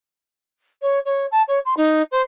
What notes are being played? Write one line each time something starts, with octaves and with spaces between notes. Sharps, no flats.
C#5
C#5
A5
C#5
C6
D#4
C5